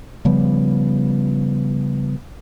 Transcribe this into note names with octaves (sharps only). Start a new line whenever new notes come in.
C#3 F3 G3 B3